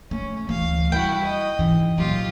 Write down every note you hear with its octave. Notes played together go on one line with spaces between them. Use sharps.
A3 C#4
D2 E3 F5
G3 E4 F#4 G5
D#5
G#2 E3
A#2 F#3 F4 G4